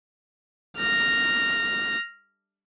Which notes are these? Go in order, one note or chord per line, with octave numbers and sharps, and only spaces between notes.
F6 A#6